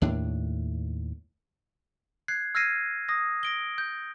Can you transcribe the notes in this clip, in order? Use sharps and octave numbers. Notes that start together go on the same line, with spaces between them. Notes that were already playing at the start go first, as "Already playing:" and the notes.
D#2 A2 D4
F#6 G#6 C7
E6 F6 G#6 A#6 C7 D#7
D#6 A#6
A#6 D7 G7
G6